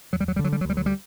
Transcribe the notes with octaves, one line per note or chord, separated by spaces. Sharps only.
E2 F#3
G3
F#3
G3
D3
F#3
G3
F#3
D2 G3
F#3
G3